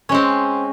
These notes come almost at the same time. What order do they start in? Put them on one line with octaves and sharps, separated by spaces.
C#4 G#3 C4